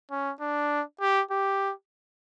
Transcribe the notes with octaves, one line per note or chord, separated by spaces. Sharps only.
C#4
D4
G4
G4